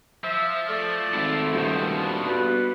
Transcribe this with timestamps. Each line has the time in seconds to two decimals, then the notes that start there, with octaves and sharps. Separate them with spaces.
0.24 F3 E5
0.69 A3 D5 D6
1.14 G#1 E4 F4
1.54 D#1 D2 B2 C5
1.96 D4 F4
2.28 G2 B2 B4